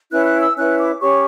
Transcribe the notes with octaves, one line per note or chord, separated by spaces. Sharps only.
C#4 E4 B4 F#6
F#6
E6
C#4 E4 B4 F#6
D6
C#4 G4 C#5 C#6